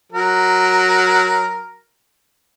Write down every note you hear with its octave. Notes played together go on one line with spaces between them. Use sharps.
F#3 A#4